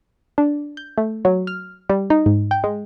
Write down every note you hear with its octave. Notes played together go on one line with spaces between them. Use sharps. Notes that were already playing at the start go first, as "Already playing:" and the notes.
D4
G6
A3
F#3
F6
G3
D#4
G#2
G5
G#3